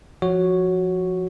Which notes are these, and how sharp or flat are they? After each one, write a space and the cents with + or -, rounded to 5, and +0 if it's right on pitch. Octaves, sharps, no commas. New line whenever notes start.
F3 +0 F#4 +0 C#5 +0